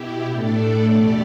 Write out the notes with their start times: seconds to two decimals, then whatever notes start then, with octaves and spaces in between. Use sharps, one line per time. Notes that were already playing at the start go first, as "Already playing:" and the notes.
Already playing: B2 E4 G4
0.28 A2 A3 D4 A4 D5
0.89 E2 B2 A3 G4 D5